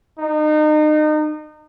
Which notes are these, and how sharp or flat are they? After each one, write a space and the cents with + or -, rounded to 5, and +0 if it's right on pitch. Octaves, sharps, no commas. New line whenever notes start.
D#4 -30